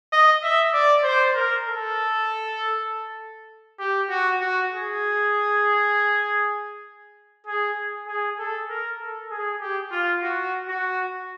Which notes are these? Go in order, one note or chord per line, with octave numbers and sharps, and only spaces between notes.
D#5
E5
D5
C5
A#4
A4
G4
F#4
F#4
G#4
G#4
G#4
A4
A#4
A4
G#4
G4
F4
F#4
F#4